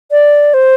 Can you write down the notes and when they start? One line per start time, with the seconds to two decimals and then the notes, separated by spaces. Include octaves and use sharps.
0.11 D5
0.54 C5